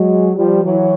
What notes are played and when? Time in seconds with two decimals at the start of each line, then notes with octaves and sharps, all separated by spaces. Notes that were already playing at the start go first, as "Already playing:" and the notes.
Already playing: F#3 G#3
0.35 F3 G3
0.64 E3 F#3